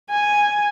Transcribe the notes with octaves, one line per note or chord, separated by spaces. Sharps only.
G#5